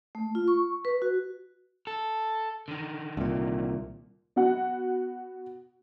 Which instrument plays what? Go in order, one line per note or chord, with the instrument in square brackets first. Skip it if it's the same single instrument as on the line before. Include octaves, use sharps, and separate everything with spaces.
[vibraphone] A3
F4
C#6
B4
F#4
[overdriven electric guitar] A4
D3 D#3
[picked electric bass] C2 A#2
[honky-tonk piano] B3 F#4 F#5